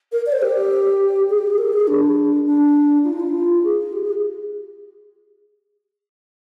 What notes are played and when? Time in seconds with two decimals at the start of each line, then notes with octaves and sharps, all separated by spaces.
0.12 A#4
0.26 D5
0.32 C5
0.42 G4
1.30 G#4
1.38 G4
1.47 G#4
1.58 A#4
1.73 G#4
1.88 D4
2.46 D4
3.04 F4
3.13 D#4
3.20 F4
3.64 G#4
3.93 G4
4.02 G#4